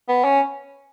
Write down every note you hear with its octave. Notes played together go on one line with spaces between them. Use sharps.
B3
C#4